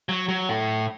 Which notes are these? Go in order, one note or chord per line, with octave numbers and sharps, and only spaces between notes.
F#3
F#3
A2